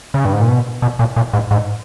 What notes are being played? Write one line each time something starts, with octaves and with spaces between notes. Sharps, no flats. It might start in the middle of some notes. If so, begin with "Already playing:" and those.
C#3
G2
G#2
A#2
B2
B2
A#2
A#2
G#2
G#2